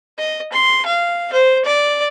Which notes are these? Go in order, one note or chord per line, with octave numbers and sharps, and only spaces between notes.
D#5
C6
F5
C5
D5